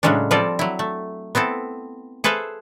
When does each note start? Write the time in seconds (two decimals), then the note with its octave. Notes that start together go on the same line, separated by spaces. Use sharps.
0.03 A2 C#3 F#3 G#3 C#4 D4
0.31 F3 G3 C4 F4 A4 D5
0.59 F#3 E4
0.79 A3
1.35 B3 C4 E4 A4
2.24 G#4 A4 B4 C5 E5 F5